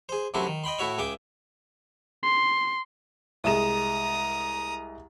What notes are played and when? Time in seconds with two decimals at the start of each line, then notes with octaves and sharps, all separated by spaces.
0.09 G#4 C5
0.34 F#2 C3 A3 E4 F#4 C6
0.47 D#3
0.64 D#5 G5 B5 C6
0.79 A2 E4 F#4 C#5 E5
0.98 C#2 G#4 E5 G5 D6
2.23 C6
3.44 C2 G#3 A#5 D#6 E7